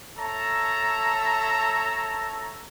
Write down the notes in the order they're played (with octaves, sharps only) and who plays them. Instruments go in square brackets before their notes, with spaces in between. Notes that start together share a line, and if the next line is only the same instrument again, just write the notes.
[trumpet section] A4 C#5 E5 A5 A#5